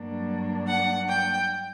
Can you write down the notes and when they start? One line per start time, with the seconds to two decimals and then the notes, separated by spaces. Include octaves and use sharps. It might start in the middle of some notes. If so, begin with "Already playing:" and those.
Already playing: G2 F#3 A#3 D4
0.67 F#5
1.08 G5